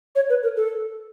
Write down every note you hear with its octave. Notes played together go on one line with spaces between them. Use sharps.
C#5
B4
A#4
A4